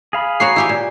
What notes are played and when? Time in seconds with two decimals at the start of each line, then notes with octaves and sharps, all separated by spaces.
0.13 G#4 F5 B5
0.40 A#3 F#4 C#5 C7
0.56 E4 G4 G#5
0.69 A#2